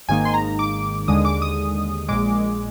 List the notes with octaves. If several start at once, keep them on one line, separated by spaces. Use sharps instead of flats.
G#1 G#2 D#3 A#3 D#4 G#5
C6
A#5
D6
D#2 D3 G#3 D#6
D6
D#6
A#1 A#2 G#3 D6